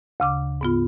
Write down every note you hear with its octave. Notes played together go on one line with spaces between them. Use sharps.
D2 C#3 D6
G#2 B3 F4